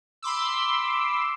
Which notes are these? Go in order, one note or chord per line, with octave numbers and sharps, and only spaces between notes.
B5 C6 D6 E6